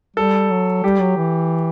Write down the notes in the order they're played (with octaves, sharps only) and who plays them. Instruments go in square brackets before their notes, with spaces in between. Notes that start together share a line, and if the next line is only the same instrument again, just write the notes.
[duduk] G3 [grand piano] A4
[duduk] F#3
[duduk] G3 [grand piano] G4
[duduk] F#3
E3